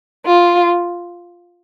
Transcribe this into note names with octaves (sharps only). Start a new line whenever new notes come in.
F4